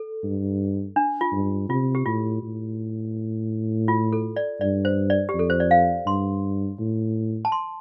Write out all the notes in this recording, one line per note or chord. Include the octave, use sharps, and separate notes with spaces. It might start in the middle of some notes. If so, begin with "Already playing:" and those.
Already playing: A4
G2
D4
F4
G2
C3 F4
G4
A2 F4
A2
F4
A4
D5
G2 D5
C5
D5
G4
F2
A4
C5
D5
F5
G2 C6
A2
A5
C6